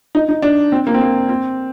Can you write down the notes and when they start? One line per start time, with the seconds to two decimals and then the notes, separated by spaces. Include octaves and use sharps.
0.15 D#4
0.29 D#4
0.42 D4
0.72 C4
0.87 A#3
0.94 C4
1.01 A#3
1.29 C4